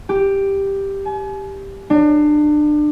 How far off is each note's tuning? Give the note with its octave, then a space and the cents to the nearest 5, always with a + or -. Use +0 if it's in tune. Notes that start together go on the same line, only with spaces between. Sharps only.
G4 +5
G#5 +40
D4 +30